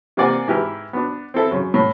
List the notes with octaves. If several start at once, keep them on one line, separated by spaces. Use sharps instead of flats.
C3 A#3 C4 D5 F#5 G#5
G#2 E4 G4 B4 F6
B3 D4
C4 E4 A4 E5
F#2 C#3
A2